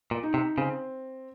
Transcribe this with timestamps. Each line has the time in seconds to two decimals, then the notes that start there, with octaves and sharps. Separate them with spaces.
0.11 A#2
0.23 D#4
0.34 C3
0.58 C#3 C4